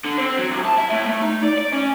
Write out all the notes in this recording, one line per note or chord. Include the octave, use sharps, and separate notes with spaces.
D3
C4
F#3
C2
A5
E4
A2
A3
D#4
D5
D5
C#4